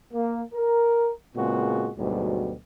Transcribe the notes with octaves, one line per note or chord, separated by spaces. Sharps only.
A#3
A#4
A#2 C#3 G#3 B3 C4 F#4
D2 G#2 B2 F#3 G3